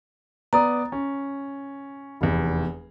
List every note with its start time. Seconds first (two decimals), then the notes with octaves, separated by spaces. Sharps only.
0.53 B3 D5 A#5 D#6
0.92 C#4
2.21 F1 E2